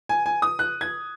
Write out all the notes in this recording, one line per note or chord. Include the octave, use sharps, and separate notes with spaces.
G#5
G#5
D#6
F#6
G#6